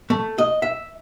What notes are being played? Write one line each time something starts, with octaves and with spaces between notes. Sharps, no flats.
A3
D#5
E5